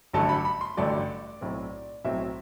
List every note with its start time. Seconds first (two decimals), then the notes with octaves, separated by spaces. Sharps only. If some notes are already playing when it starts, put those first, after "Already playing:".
0.13 A1 G2 D3 F#3 A3 A5
0.29 B5
0.45 B5
0.61 C6
0.77 A1 G2 D3 F#3 A3 D5
1.41 B1 A2 F#3 C4
2.05 B1 A2 F#3 C4 E5